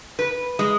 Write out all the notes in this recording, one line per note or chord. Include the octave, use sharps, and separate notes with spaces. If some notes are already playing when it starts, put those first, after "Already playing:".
B4
G#3